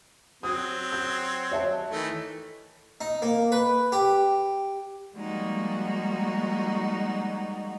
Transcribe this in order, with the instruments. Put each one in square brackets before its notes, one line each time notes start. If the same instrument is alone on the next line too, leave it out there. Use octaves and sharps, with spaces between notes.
[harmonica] F#3 C4 [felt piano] D#6
[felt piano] G6
C#5 E5 A5
[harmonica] D#3 E3 A3
[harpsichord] D#4
A#3
B4
G4
[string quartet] F3 G3 G#3 A#3 D#4 F#4